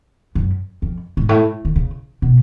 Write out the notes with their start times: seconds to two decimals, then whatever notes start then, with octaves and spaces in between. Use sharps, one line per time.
0.35 F#2
0.82 F2
1.17 G#2
1.29 A2
1.65 D3
1.76 C#3
2.22 B2